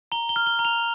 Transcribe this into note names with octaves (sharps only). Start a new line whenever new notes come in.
A#5 G7
G7
F6
G7
A#5
F7